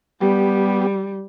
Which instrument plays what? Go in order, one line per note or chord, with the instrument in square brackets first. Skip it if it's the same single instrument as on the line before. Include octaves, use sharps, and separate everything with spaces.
[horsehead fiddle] G3 [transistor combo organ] B3 G4